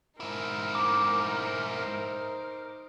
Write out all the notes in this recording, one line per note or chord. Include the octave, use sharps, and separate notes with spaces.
G#2 D#4 E4 A#4 C5
D6